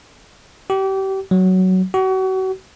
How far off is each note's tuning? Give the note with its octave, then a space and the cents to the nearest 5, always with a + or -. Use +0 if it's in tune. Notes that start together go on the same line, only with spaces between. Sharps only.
G4 -30
F#3 +10
F#4 +35